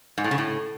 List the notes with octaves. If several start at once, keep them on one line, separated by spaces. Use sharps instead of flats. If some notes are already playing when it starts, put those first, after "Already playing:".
G#2
A2
C#3
A2